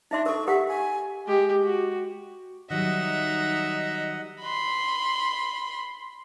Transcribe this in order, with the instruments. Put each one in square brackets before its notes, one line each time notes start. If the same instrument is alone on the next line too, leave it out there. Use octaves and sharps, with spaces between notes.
[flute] D4 [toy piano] D#4 E5 C6
[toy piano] A4 A#4 [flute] C#6
[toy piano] G4 A#4 F#5 [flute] E5
[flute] G#5
[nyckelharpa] G#3 G4
F#4
[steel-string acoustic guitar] D#3 F#3 G3 [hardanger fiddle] D#4 E5 [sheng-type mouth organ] D#5 F#5
[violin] B5 C6